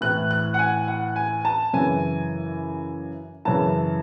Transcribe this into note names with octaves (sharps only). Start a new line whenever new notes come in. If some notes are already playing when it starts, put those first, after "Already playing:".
A2 E3 F#6
F#6
F#5
G#5
F#5
G#5
A5
F#2 C#3 E3 G#5
F#2 C#3 E3 A5